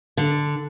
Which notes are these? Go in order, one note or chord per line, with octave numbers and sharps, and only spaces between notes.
D3